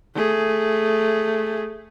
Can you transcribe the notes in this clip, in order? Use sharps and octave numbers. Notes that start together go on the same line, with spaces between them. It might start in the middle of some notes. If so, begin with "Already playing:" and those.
A3 G#4